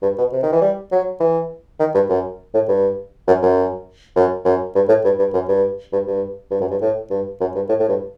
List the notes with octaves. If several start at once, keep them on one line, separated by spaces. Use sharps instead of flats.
G2
B2
C3
D#3
E3
G3
F#3
E3
D#3
G2
F#2
A2
G2
F#2
F#2
F#2
F#2
G2
A2
G2
G2
F#2
G2
G2
G2
G2
F#2
G2
A2
G2
F#2
G2
A2
A2
G2